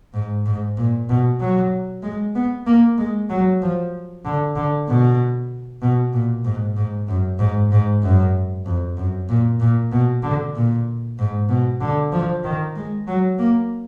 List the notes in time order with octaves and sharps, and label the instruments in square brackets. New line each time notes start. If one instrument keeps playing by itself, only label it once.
[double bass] G#2
G#2
A#2
B2
F#3
G#3
B3
A#3
G#3
F#3
F3
D3
D3
B2
B2
A#2
G#2
G#2
F#2
G#2
G#2
F#2
F2
F#2
A#2
A#2
B2
D3
A#2
G#2
B2
D3
F3
D#3
G#3
F#3
A#3